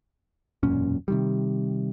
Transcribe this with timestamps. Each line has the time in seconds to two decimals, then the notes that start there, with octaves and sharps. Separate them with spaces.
0.63 E1 F#2 A#2 C#4
1.08 C3 D#3 G3